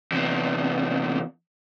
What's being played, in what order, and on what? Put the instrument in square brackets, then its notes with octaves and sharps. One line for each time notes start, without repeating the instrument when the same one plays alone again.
[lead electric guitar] E2 C3